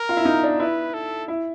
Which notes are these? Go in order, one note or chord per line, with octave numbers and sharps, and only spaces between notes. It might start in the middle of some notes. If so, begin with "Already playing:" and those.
Already playing: A#4
F4
E4
D#4
D4
E4 B4
A4
E4